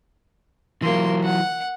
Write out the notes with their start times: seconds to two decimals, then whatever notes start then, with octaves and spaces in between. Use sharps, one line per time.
0.82 E3 F#3 A#3 C6
1.24 F#5